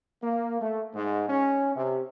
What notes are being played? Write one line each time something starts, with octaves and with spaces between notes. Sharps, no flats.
A#3
A3
G#2
C#4
C3